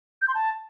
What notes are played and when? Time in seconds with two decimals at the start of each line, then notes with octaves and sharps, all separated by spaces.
0.22 G6
0.28 C6
0.35 A5